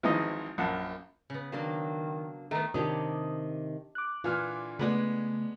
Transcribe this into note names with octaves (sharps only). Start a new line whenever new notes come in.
G#1 E3 F3 G#3 D#4 D#5
A#1 F#2 F#5 A5
C#3 B3
D#3 F#3 A#3 D4
D#3 A3 B3 A#5
C3 D#3 D4 G4 C#5 D#6
D6 F#6
A#2 D3 E3 F4 F6
C#3 G#3 A3 B3 B4 D5 F#5 G#5